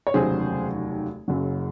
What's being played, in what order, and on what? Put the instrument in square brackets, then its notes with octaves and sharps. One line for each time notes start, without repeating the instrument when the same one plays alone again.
[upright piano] C#5
F1 D#2 C#3 F#3 G#4 C5
F#1 F#2 C#3 F#3